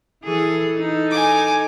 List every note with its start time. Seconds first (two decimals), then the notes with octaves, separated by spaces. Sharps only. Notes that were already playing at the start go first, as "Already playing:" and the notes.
0.24 E3 G#4 A4
0.77 D#4 A4
1.11 G#5 D6